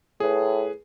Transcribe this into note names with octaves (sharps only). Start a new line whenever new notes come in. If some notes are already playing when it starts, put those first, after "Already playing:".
A2 G#4 B4